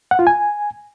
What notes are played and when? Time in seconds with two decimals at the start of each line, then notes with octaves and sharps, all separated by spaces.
0.11 F#5
0.19 F4
0.27 G#5